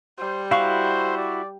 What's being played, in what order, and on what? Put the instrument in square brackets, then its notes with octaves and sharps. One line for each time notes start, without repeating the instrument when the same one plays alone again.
[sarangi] G3 [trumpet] C5
[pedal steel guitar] E4 F#4 C#6 [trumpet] C5 [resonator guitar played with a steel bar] F5
[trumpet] D5